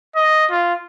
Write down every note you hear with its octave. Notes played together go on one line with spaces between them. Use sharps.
D#5
F4